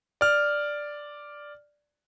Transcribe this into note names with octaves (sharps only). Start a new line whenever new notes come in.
D5 F6